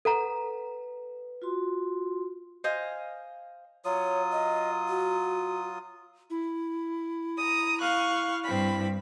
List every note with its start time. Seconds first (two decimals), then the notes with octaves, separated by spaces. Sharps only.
0.05 A4 B4 F#5 A#5
1.42 F4 F#4 C6
2.64 C5 D#5 F5 G#5
3.85 F#3 F4 C#5 D#6
4.32 D#5
4.88 F#4
6.30 E4
7.36 A#5 D#6
7.81 F5 C#6 F#6
8.44 G2 C4 B5